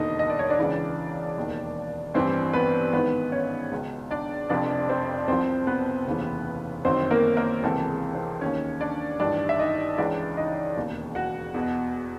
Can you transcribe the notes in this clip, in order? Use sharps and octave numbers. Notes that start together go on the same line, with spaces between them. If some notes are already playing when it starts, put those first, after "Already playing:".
Already playing: E1 D#2 D3 D#4 D#5
D#5
D5
C#5
D4 D5
C#2 C#3 E3
E1 D#2 D#3
A1 G2 E3 C4 C5
B3 B4
G#1 G#2 D#3 B3 B4
C#4 C#5
C#2 B2
D4 D5
F1 F2 C3 F3 D4 D5
C4 C5
C2 C3 F3 C4 C5
B3 B4
F1 D#2 C#3 E3
G1 F#2 D#3 C4 C5
A#3 A#4
A#3 A#4
C#2 C3 E3 A4
A4
G#4
C4 C5
D#2 D#3 C#4 C#5
D4 D5
A1 G2 D#3 D4 D5
E5
D#4 D#5
C#2 C#3 E3 D4 D5
D#4 D#5
E1 D#2 C#3
F#4 F#5
E2 B2